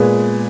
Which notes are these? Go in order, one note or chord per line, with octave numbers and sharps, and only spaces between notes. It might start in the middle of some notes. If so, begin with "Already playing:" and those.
Already playing: A#2 G#3 B3 G#4 B4